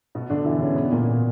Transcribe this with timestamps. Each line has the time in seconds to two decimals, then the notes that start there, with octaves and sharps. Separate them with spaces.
0.15 B2 B3
0.30 D3 D4
0.45 E3 E4
0.61 C#3 C#4
0.76 B2 B3
0.91 A#2 A#3